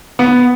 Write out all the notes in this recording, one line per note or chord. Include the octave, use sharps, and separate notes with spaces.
B3